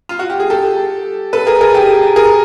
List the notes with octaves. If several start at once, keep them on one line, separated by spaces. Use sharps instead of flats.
F4
F#4
G4
G#4
G4 A4
A4 B4
G#4 A#4
G#4 A#4
G4 A4
G#4 A#4